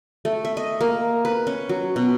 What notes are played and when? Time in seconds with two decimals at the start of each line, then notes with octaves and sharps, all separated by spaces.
0.25 A3
0.45 E5
0.57 D#5
0.81 A#3
1.25 B4
1.47 C#4
1.69 F#3
1.96 B2